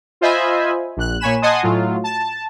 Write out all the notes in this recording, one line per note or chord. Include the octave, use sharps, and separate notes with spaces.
F4 C5 D#5 E5 G#5 B5
A#1 F#6
A#2 C#5 G#5 B5 E7
D#5 F#5 G#5 A5 C6 D#6
A2 F#3 F4
A5